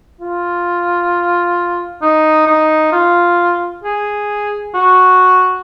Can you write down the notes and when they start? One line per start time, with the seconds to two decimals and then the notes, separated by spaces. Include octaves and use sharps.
0.21 F4
2.02 D#4
2.48 D#4
2.93 F4
3.84 G#4
4.74 F#4